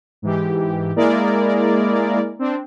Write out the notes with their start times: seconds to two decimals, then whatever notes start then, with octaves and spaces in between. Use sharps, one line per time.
0.22 G#2 E3 G4
0.96 G#3 A#3 E4 G#4 A#4 D5
2.39 C4 D4